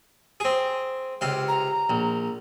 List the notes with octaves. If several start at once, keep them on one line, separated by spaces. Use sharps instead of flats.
C4 G#4
C#2 C3 F5
A#5
A#1